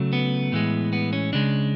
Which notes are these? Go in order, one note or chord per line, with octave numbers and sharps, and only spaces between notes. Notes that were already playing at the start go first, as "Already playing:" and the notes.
Already playing: C#3 F#3 A3
B3
A2 E3 G#3
B3
C#4
C#3 G#3 D4